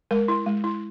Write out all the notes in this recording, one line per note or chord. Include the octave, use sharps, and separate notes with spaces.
G#3 A#4
E4
G#3
E4